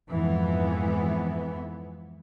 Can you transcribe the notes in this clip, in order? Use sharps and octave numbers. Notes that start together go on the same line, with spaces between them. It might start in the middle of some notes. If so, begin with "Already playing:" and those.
F2 G#2 E3 B3